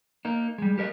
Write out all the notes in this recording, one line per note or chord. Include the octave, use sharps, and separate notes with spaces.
A#3 D#4
G3 G#3
G4 A#4 C#5 D#5